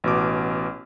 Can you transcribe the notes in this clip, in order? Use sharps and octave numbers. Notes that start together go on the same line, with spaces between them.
A1 B2 D6